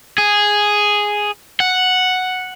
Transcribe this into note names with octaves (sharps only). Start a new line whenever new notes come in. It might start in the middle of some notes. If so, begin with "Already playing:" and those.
G#4
F#5